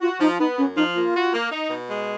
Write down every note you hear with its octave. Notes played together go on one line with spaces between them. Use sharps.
F4 F#4
F3 D#4
B3 D#4
F#2 C#4
F3 D#4
A#3 F4
F#4
A#3
D#4
B2
G#3